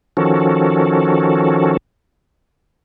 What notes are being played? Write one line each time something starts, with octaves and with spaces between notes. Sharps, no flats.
D#3 F3 C#4 F#4 A4